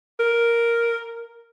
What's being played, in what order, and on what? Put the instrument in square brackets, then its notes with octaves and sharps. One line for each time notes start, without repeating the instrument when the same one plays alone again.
[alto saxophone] A#4